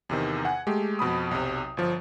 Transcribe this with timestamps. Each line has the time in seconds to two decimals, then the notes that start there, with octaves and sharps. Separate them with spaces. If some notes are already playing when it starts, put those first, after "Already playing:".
0.09 E2 C3 D#3
0.45 F#5 G#5
0.67 G#3 A3 G4
0.99 F2 B2 B5 D#6
1.31 B1 C3
1.77 G1 F3